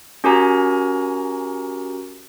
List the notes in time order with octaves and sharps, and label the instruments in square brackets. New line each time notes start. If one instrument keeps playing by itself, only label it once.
[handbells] C#4 F#4 G4 A#4 G#5 A#5